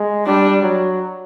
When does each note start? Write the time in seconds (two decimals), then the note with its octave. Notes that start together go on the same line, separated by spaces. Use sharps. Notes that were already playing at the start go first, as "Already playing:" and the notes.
Already playing: G#3
0.26 G3 D4
0.63 F#3